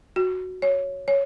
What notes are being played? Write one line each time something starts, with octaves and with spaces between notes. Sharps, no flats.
F#4
C#5
C#5